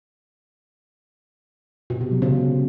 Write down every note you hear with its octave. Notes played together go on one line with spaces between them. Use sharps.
B2
C3
F#3
C#3